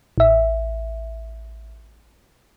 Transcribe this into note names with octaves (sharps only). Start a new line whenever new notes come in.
A1 E5